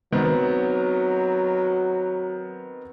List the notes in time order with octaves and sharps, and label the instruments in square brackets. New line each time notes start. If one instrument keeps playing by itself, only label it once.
[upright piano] D#3 B3 C4 [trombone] F#3